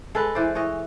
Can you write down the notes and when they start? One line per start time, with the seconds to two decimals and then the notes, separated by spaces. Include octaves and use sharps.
0.15 G#3 A4 B4
0.35 E3 C5 D5
0.55 E3 C#5 D#5